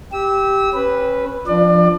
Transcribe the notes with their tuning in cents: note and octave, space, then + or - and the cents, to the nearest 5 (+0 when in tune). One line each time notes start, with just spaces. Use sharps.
G4 +0 E6 -30
C#4 -25 B4 +0
F3 +0 D4 +0 D5 +30